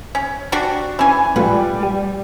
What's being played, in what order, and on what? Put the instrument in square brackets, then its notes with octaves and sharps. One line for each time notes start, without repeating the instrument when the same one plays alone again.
[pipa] C#4
D4 F#4 G4
[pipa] E3 G#5 [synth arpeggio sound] C#4 C#5
[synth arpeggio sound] A#2 A3 F4 [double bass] G3 [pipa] B4
[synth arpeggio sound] G4